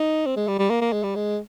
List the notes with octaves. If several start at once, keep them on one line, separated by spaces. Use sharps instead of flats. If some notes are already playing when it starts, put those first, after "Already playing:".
Already playing: D#4
C4
G#3
G3
G3
A#3
A#3
G#3
G3
G#3